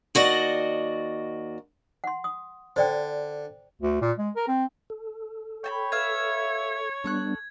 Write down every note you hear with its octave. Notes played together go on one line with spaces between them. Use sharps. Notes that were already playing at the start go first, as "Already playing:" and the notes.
D#2 F#4 D5 D#5
F#5 C6
D#6
D3 C5 D5 G5
D2
A#2
G#3
A#4
C4
A4
C#5 G5 A5 B5
B4 E5 F5 G#6
G3 B3 D4 A4 C#6 F#6